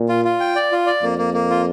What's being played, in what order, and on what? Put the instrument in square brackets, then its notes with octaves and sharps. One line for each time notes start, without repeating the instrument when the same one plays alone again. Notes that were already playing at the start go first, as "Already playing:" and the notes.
Already playing: [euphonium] A#2
[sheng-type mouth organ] F4
F4
G5
D5
F4
D5
[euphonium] F2 [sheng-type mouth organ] A#3
[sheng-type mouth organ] A#3
A#3
F4